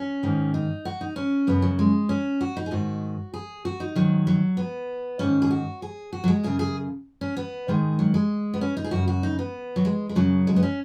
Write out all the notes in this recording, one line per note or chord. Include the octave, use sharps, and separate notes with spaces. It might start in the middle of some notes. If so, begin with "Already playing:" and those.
Already playing: C#4
G#2 D#3
D#4
F#4
D#4
C#4
F#2 C#3 B3
F#3
G#3
C#4
F#4
D#4
G#4
G#2 D#3 F#4
G#4
F#4
D#4
G#2 D#3 F#3
F#3
B3
G#2 D#3 C#4
G#4
F#4
G#4
F#4
F#3
G#3
F#2 C#3 G#4
G#4
C#4
B3
G#2 D#3 G#3
F#3
G#3
B3
C#4
D#4
G#4
F#2 C#3 F#4
F#4
D#4
B3
F#3
G#3
G#3
F#2 C#3 F#3
G#3
B3
C#4